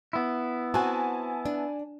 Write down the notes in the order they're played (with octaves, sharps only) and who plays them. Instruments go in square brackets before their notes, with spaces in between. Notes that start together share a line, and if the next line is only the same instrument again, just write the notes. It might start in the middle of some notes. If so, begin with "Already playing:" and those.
[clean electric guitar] B3 E4
[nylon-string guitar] C4 F#4 [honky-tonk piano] G#5 A5
[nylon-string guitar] D4